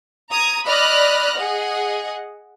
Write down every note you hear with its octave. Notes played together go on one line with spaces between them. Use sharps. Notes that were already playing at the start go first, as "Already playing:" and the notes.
A#5 D#6 G#6
D5 D#5 B5 F6 F#6 A#6
G#4 D#5 F#5